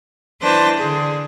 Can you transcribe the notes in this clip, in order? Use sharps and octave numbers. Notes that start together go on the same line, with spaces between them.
E3 D4 B4 C5 A5 A#6
D3 G#4